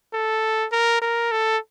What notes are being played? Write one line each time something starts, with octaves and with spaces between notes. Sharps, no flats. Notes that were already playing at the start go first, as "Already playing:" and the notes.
A4
A#4
A#4
A4